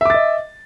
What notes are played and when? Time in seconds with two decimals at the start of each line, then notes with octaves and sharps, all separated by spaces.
0.01 E5
0.05 D6
0.10 A6
0.14 D#5